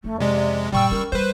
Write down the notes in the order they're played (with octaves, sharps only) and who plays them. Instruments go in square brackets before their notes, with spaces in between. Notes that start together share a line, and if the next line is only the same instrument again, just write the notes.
[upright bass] F2 C#4 [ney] A3
[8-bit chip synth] C3 G#3 [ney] D5
[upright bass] F#2 A#2 [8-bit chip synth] G3 C#6 E6 [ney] G5
[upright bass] C#4 [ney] A#4
[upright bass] G3 [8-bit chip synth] B4 C5